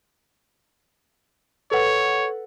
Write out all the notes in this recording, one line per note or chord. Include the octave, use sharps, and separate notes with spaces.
A4 B4 C#5 F#5